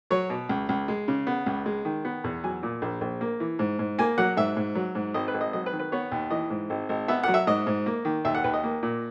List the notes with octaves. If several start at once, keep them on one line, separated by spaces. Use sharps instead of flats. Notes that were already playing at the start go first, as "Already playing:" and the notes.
F#3 C#5
B2
C#2
C#2
G#3
C#3
B3
C#2
G#3
D#3
B3
E2
F#3 G#5
A#2
A#1
A#1
A#3
E3
G#2
G#2
A#3 G#5
F#3 F#5
G#2 E5
G#2
F#3
G#2
G#1 D#5
B4
G#1
D#5
F#3 D#5
B4
D#3
B4
B3 C#5
D#2
E3 D#5
G#2
G#1
G#1
B3 E5
F#3 F#5
E5
G#2 D#5
G#2
A#3
D#3
D#2 E5
F#5
D#2 B4
D#5
A#3
A#2